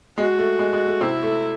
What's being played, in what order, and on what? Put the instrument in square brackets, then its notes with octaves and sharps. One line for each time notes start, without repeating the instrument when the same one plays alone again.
[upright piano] G#3 [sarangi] F#4
[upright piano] A3
G#3
G#3
A3
[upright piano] C3 C4 [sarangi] E4
[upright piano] A3